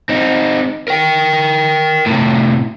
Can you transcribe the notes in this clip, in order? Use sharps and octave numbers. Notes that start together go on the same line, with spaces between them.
C4 D#4
A#4 G5
A2 C3